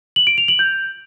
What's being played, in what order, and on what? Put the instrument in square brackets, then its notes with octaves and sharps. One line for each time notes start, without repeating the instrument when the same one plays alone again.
[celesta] F#7
D7
F7
F#7
G6